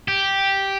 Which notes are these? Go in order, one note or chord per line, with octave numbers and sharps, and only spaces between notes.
G4